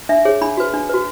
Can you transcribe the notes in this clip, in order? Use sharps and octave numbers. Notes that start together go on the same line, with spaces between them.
D4 E5
G#4 C#5
D4 B5
F#4 B4
D4
F#4 B4